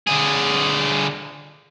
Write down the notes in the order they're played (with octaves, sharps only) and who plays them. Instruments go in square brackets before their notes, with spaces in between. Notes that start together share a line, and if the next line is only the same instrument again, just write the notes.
[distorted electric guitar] D3 G#4